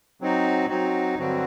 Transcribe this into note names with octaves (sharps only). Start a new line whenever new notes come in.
F#3 C4 D#4 F#4
F#3 C4 D#4 F#4
G2 D3 F#3 C4 F#4